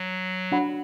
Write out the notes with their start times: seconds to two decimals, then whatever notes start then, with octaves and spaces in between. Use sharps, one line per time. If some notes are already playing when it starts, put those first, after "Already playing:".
Already playing: F#3
0.52 D4 F#4 C#5 F#5 B5